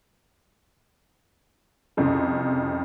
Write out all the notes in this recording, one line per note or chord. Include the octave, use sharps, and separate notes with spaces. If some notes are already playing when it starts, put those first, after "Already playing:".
C2 F2 C#3